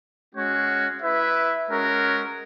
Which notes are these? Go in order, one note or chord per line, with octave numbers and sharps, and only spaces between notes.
G#3 C#4 F#4 C#5
E4 B4 E5
G#3 C#4 F#4 A#4